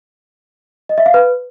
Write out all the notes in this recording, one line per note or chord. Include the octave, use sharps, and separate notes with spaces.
D#5
E5
F5
B4